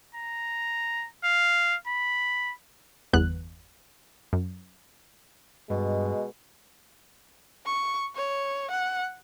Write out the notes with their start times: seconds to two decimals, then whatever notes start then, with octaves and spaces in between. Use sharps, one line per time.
0.15 A#5
1.24 F5
1.87 B5
3.13 G1 E2 B3 F#6
4.33 F#2
5.70 G2 B2 G#3
7.66 C#6
8.16 C#5
8.71 F#5